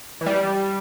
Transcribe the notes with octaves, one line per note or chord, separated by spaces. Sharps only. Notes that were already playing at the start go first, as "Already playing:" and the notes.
E3
G3